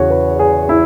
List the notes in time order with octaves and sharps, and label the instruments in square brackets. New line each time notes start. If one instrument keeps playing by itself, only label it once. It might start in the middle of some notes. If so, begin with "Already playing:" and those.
Already playing: [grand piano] E2 C#3 E3 F#4 G#4 C#5
B4
G#4
E4